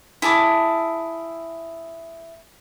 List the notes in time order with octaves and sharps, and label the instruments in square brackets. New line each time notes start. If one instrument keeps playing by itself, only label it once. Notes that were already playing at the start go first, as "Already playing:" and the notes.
[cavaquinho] E4 G#4 A5 D6